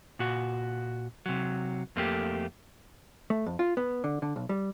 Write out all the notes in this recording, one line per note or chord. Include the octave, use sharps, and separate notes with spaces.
A#2 F#4
C3 F#3
F2 A3 A#3 D4 G4
A3
F2
F4
B3
D3
D3
B1
G3